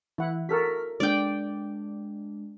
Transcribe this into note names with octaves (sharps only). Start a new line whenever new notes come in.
E3 E4 F#5
F#4 A4 A#4 C#6 F6 B6
G#3 D4 D5 G5